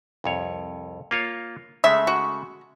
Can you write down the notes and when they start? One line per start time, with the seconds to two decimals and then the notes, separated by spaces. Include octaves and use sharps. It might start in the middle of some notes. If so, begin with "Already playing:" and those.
0.24 C2 F2 C#5
1.11 A#3 F4 C#5
1.84 C#3 G#3 A3 E5
2.07 F#4